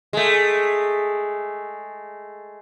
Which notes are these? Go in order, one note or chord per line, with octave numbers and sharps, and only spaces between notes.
G#3 A3